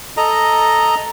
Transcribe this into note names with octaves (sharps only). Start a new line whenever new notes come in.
A4 D#5 A#5